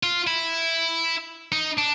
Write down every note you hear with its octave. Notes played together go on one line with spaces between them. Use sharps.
F4
E4
D#4
D4